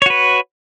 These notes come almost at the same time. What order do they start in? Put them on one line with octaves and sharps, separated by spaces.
C#5 F#4 B4